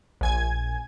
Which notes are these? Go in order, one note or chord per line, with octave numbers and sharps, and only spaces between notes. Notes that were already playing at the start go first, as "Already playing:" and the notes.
A#1 G#5 G#6